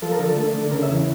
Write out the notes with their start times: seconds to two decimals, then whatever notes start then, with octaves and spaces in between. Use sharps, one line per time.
0.02 F3 A4
0.11 A#4
0.19 D3 A4
0.36 A3
0.53 D3
0.71 C#3 A#4
0.83 E5
0.89 E2